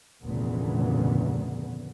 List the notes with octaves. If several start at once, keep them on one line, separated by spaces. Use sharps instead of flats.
F1 D2 A#2 C#3 E3 B3